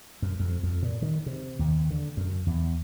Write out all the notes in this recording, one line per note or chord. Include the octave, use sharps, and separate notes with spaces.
F#2
F2
F2
A#2
D#3
C3
D#2
D3
F#2
E2